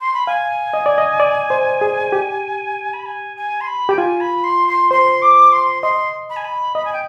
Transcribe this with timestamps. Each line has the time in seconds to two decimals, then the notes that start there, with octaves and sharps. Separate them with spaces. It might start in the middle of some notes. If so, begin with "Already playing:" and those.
0.01 C6
0.14 B5
0.27 F5 G#5
0.74 D#5
0.86 D5
0.98 D#5
1.20 D5
1.50 C5
1.81 G#4
2.12 G4
2.93 B5
3.06 G#5
3.36 G#5
3.60 C6
3.66 B5
3.89 G4 G5
3.98 F4 G#5
4.20 B5
4.43 C6
4.68 C6
4.91 C5 C6
5.22 D6
5.52 C6
5.82 D#5 C6
6.29 B5
6.36 G#5
6.44 B5
6.75 D#5 B5
6.85 G#5
6.92 G5